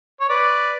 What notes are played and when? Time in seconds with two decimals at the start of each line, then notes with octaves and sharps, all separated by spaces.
0.20 C#5
0.29 B4 D5